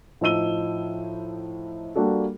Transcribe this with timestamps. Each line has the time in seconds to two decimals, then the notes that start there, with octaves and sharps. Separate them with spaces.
0.21 A2 F3 D#4 E6 D#7 G7
1.96 G3 A#3 D4 F#4 A4